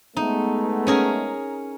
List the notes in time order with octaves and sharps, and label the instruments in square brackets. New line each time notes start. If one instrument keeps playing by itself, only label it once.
[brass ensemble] G#3 A3 B3 [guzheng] D#4
[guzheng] C#4 G#4 A#4